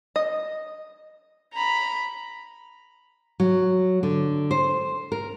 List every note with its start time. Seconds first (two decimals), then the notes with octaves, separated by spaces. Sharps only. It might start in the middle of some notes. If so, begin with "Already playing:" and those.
0.16 D#5
1.53 A#5 B5
3.40 F#3
4.03 D3
4.51 C5
5.12 A#4